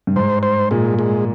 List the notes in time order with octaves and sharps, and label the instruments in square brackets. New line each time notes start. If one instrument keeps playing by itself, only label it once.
[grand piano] G2
[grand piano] G#2 [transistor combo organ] C5
[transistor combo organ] C5
[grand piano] A#2 [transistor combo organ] G#3
[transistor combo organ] G#3